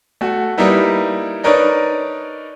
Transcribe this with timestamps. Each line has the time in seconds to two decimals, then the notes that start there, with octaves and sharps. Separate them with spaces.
0.21 A3 F#4
0.58 G3 A#3 D#4 E4 B4
1.43 D4 D#4 A#4 B4 C#5 D5